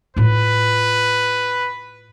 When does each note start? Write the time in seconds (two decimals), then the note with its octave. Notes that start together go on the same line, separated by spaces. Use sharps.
0.17 A2 F4 B4